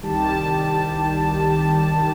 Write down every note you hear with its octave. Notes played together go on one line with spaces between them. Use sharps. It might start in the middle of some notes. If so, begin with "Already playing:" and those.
C2 D#3 G3 G4 A5